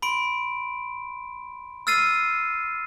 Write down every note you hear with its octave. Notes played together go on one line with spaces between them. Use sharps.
B5 C6 D7
E6 F6 A6 C7 D#7